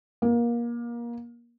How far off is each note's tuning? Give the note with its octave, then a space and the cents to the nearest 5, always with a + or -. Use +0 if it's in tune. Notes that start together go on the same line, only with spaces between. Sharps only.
A#3 +25